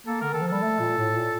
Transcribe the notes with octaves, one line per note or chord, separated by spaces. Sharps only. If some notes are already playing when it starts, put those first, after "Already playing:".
A#3 A4
D3 A#4
D#3 A4
F3
G3 A4
A3
A#2
A2
A#2